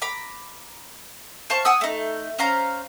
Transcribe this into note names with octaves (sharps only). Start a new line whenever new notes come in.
A#5 B5 D6
C5 F5 A5 C#6
F#5 G#5 D#6 E6
A3 D#4
C#4 C5 F5 A#5